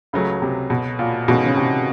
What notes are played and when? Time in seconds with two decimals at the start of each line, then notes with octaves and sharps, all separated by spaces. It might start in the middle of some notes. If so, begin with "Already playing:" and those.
0.13 C#2 C#3 F#3 A3
0.42 C3
0.70 B2
0.99 A#2
1.28 G#2 B2 E3 A3 C#4 F#4
1.46 C#3
1.57 C3